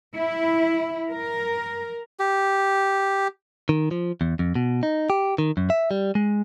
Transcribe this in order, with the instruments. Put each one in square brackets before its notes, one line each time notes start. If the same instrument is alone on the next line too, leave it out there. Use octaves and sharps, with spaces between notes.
[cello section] E4
A#4
[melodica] G4
[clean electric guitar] D#3
F3
E2
F2
B2
D#4
G4
D#3
F#2
E5
G3
G#3